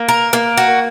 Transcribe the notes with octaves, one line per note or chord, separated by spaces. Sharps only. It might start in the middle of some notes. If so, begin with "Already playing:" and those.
Already playing: A#3
A#4
A#3
F#4